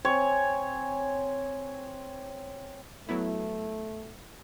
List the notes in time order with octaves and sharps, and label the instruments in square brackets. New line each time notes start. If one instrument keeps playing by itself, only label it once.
[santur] C4 G#5 [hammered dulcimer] C#5
[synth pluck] F#3 B3 E4 [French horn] A3